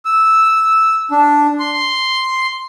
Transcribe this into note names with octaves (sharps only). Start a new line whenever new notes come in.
E6
D4
C6